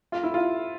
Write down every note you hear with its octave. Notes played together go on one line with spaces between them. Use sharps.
F4
E4
F4